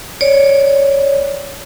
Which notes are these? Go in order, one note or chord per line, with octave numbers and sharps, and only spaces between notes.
C#5 D5